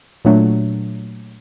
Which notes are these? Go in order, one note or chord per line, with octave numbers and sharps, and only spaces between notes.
A#2 F#3 A3 D4